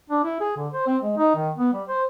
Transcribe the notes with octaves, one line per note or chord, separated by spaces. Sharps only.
D4
E4
G#4
D3
C5
C4
G#3
D#4
D#3
B3
G3
C5